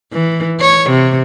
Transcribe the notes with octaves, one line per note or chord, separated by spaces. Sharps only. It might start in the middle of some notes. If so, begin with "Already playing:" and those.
E3
C#5
C3